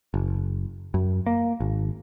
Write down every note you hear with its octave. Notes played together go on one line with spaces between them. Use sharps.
F#1
F#2
A#3
G#1